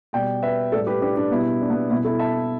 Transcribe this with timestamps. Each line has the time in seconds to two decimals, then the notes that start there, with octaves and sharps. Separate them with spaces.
0.13 B2 G3 D5 G5
0.42 B4 E5
0.72 A2 G3 A4 D5
0.87 G4 B4
1.02 D4 G4
1.16 D4 G4
1.31 B2 G3 B3 E4
1.61 D4
1.70 B3
1.90 B2 G3 B3 E4
2.04 E4 A4
2.19 E5 A5